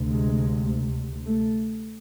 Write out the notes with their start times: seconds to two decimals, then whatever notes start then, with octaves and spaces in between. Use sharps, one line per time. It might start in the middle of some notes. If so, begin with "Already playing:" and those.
Already playing: D2 C3
0.12 G#3
1.25 A3